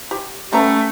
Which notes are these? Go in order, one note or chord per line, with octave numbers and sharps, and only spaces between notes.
G4
G3 A3 B3 C#4 A#5